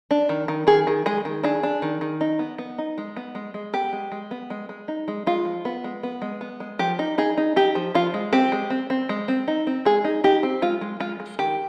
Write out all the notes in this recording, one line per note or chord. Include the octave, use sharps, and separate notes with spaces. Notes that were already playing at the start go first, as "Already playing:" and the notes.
D4
D#3
D#3
D#3 G#4
D#3
G#3 G#4
D#3
D4 G#4
D4
D#3
D#3
D#4
B3
B3
D#4
G#3
B3
G#3
G#3
B3 G4
G#3
G#3
B3
G#3
G#3
D#4
G#3
G#3 F4
F3
B3
G#3
B3
G#3
B3
G#3
F3 G4
D#4
D#4 G#4
D#4
D#4 G4
F3
F3 F4
G#3
C4 G4
G#3
C4
C4
G#3
C4
D#4
C4
G#3 G#4
D#4
D#4 G4
C4
G#3 F4
G#3
G#3 F4
G#3
D#3 G4